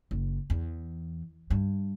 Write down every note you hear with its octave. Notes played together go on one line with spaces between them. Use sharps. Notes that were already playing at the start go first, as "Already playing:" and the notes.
F#1
E2
G2